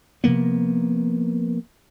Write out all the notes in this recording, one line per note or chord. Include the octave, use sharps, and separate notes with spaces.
C3 F3 A#3 B3